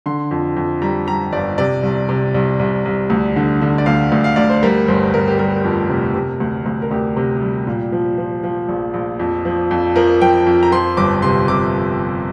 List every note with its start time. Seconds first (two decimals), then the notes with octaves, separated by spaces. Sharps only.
0.06 D3 C6
0.31 F2
0.57 F2
0.82 G3 A#5
1.07 G3 A#5
1.32 G1 D5
1.58 C3 D5
1.83 C2
2.09 C3
2.34 C2
2.59 C2
2.85 C2
3.10 D2
3.36 D3
3.62 D3
3.78 D5
3.86 D2 F5
4.12 D2
4.24 F5
4.36 D2 D5
4.49 C5
4.63 G3 A#4
4.88 G1 C5
5.14 G1 A#4
5.28 G4
5.39 G3 A#4
5.64 F2
5.89 C3
6.15 C3
6.40 D2
6.66 D2
6.82 A#4
6.91 D2 G4
7.17 C3
7.42 G3
7.67 A#2
7.92 F3
8.18 F3
8.44 F3
8.69 A#1
8.94 A#1
9.19 F2
9.45 F3
9.71 F2
9.96 F3 A#4
10.21 F3 G5
10.47 F2
10.63 A#5
10.72 F3 C6
10.97 G1 D6
11.22 C3 C6
11.48 C3 D6